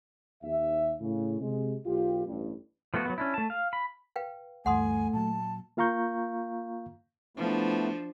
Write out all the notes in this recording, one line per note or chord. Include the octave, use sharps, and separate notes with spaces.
D#2 E5
A2 C#3
C3 G#3
B1 F4 G4
A1 G2
F3 A3 B3 F#4
F#3 A3 B3
C#4 D4 E4
A3 A5
F5
B5
B4 F5 G5
D2 G2 E3 A3 F#5 G#5 C6 D#6
A#2 F#3 A5
A#3 F4 F5 A#5 C#6 G6
F3 A3 B3 D4 E4